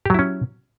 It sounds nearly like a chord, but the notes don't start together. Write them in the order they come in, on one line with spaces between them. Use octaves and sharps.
G4 F#3 E4 C#4